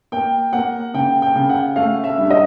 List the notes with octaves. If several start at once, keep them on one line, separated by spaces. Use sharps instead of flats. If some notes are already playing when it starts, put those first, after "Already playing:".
A#3 G5
A#3 F#5
C#3 G5
G5
C#3
F#5
A3 F5
E5
G2
D#5